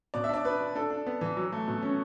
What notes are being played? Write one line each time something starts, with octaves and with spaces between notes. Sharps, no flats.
B2 D5
E5
D4 D5
D4 B4
D4
D4 A4
D4
B3
E3
F#3
A3
B2
C#4